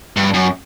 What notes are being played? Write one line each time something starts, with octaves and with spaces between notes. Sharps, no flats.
G2
F#2